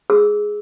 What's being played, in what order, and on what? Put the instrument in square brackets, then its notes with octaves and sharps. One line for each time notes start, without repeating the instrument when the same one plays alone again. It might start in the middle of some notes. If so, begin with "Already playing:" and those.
[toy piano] G#4 E6